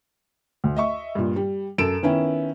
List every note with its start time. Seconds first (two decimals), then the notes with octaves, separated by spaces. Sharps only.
0.64 D2
0.76 D#5 E5 C#6
1.15 G2 A#2
1.36 G3
1.78 F#2 A4 D7 E7
2.03 D#3 B3 C#4 E4